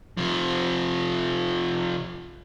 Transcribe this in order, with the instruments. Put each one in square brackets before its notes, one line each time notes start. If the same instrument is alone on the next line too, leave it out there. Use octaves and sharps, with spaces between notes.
[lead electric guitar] C3 F3